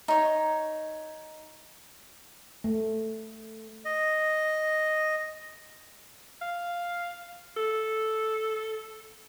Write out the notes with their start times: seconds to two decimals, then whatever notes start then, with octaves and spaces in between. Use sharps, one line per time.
0.08 D#4 C#5
2.64 A3
3.85 D#5
6.42 F5
7.57 A4